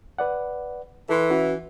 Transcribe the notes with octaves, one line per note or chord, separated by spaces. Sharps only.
B4 D5 F#5
E3 A4 C6
C#4 E4 F#4